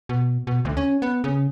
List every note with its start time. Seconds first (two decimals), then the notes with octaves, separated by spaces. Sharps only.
0.09 B2
0.47 B2
0.65 D2
0.77 C#4
1.02 B3
1.24 C#3